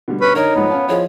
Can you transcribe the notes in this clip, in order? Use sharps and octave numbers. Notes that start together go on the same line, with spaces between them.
B2 D3 G3
C#4 B4
D3 D#4 A#4 C#5
G#2 F3 G#3 B3
C#4 F5 A5
F3 E4 G#4 C#5 D#5